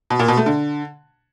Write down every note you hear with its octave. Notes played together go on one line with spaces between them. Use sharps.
B2
A#2
B2
A3
D3